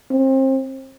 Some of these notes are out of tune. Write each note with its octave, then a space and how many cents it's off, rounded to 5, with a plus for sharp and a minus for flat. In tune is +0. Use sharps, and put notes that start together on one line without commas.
C4 +30